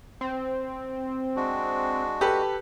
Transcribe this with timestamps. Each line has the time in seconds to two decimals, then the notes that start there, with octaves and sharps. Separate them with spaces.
0.21 C4
1.36 G#3 D4 F#4
2.21 G4 A4 B4